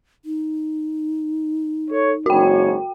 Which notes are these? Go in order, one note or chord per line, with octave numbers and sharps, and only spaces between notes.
D#4
A4 C#5
F#1 G#2 F#4 C#5 G5